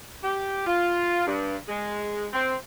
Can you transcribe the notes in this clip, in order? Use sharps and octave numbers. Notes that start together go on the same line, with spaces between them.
G4
F4
G2
G#3
C4